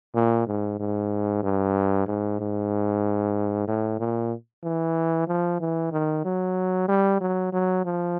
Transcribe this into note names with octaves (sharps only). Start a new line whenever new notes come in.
A#2
G#2
G#2
G2
G#2
G#2
A2
A#2
E3
F3
E3
D#3
F#3
G3
F#3
F#3
F3